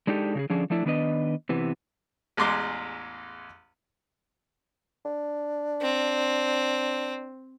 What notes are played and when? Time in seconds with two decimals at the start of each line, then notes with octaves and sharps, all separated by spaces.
0.07 G#3 D4 D#4 G4 A4
0.35 C#3 G4 G#4
0.50 D3 F3 C#4 D4 G#4
0.70 F3 A3 D4 E4
0.86 D#3 B3 D4 B4 D#5
1.49 C3 E3 B3
2.37 A1 E2 G#3 C6 D6
5.05 D4
5.82 C4